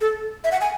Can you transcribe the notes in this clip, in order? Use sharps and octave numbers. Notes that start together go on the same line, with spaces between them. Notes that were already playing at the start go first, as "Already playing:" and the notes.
A4
E5
F#5
G#5